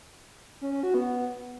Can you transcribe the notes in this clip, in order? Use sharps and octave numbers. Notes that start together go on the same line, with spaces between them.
C#4
C#4
F#4
B3